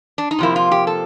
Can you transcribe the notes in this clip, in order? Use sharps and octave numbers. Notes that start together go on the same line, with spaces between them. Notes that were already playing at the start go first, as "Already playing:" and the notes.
D4
D#4
C3 F3 A#3 E4
F4
G4
A4